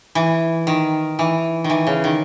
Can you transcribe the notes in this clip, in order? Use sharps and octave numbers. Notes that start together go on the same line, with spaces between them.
E3
D#3
E3
D#3
E3
C#3
D#3